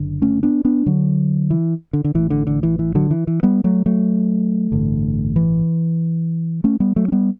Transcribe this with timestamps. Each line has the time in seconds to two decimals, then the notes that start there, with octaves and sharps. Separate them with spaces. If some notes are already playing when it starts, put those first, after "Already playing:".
Already playing: F#1 D3
0.22 A3 C#4
0.43 B3 D4
0.65 B3 D4
0.86 D3 F#3
1.50 E3
1.93 D3
2.04 D3
2.14 A1 A2 E3
2.30 D3
2.47 D3
2.63 E3
2.79 E3
2.95 D3 F#3
3.11 E3
3.27 E3
3.43 G3 B3
3.64 F#3 A3
3.86 F#3 A3
4.72 A1 G2 D3
5.36 E3
6.64 A3 C#4
6.80 G3 B3
6.96 F#3 A3
7.08 C#4
7.12 G3 B3